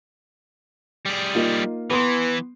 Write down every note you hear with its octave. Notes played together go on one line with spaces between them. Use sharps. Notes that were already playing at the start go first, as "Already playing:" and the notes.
G3 G#4
A#3 D#4 F4
E3 B3 C6